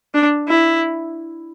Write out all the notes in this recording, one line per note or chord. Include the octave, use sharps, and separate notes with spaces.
D4
E4